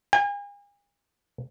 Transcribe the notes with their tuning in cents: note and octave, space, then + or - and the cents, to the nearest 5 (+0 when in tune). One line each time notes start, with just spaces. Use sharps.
G#5 -40